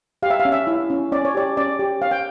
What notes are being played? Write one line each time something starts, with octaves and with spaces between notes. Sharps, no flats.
G4 F5
E5
F5
C#4
E5
E4
C#4
C#4 D5
C#5
G4 D5
C#4 D5
G4
C#5 F5
G5